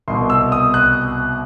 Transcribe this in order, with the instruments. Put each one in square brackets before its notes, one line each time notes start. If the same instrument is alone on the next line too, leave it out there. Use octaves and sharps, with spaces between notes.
[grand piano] C2 B2 C6
E6
D#6
F#6